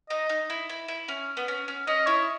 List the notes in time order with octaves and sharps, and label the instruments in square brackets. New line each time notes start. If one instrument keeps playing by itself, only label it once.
[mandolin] D#4 [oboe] D#5
[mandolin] D#4
E4
E4
E4
C#4
B3
C#4
C#4
[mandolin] C#4 [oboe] D#5
[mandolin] E4 [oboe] C#5